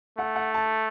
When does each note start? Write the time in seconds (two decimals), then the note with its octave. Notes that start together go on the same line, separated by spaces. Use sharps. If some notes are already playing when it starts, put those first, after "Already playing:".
0.18 A3 F#5
0.36 F#5
0.54 A5